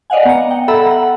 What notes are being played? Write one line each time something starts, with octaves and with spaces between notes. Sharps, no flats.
D5 D#5 F5 F#5 G#5
B3 A#5 C#7
G5
A4 E5 F#5 A#5 B5 E6
F#5